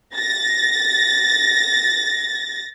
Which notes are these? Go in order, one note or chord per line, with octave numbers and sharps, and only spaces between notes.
A6 A#6